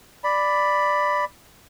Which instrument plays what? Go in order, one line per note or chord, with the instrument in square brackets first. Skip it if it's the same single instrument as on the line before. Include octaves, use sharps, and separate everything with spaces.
[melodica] D5 B5